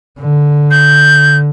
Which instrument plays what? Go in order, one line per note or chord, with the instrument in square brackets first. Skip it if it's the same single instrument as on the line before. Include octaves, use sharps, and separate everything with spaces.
[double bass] D3
[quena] G6